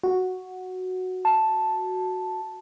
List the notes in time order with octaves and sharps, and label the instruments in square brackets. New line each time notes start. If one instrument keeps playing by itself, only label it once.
[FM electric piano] F#4
[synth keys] A5